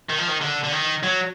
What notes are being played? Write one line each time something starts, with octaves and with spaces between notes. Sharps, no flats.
D#3
F3
D#3
D3
D3
D#3
F#3